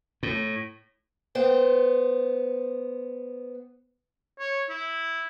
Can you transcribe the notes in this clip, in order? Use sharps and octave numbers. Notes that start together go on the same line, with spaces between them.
A2
B3 C5 G5
C#5
E4